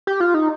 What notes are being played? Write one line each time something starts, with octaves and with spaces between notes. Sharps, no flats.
G4
F4
D#4